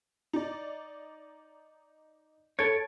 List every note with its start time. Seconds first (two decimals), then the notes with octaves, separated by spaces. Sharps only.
0.33 D#4 D5
2.59 A4 C#5 G#6 D7